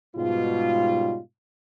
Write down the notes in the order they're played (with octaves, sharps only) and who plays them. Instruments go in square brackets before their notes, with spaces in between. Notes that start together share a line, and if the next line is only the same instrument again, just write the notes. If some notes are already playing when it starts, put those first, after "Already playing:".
[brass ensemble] G#2 B2 G3 F4